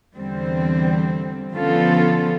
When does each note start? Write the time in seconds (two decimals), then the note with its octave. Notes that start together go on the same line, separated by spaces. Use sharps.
0.17 E2 D3 G3 C4
1.53 D3 F3 B3 C#4 F4 A4